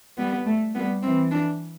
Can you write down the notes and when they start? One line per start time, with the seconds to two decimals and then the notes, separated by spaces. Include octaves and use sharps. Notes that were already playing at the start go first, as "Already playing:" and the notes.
0.18 G3 B3
0.46 A3
0.75 G3 B3
1.02 E3 C4
1.31 D4